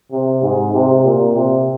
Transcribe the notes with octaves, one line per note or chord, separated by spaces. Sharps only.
C3
G#2
C3
A#2
C3